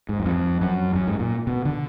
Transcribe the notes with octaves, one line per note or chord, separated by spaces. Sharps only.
G#2
F#2
F2
F#2
F#2
G#2
A#2
B2
D3